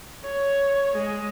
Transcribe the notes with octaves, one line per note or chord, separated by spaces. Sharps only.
C#5
G#3